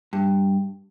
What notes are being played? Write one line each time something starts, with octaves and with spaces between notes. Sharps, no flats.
G2